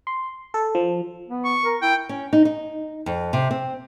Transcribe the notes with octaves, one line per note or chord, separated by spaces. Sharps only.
C6
A4
F3
B3
C#6
A#4
E4 G5
C#4
D#4
D#4
F2
C3
C4